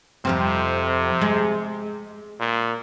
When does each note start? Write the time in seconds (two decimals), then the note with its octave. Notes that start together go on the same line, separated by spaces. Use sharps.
0.25 F2 C3 F3 C4
1.21 G#3
2.39 A#2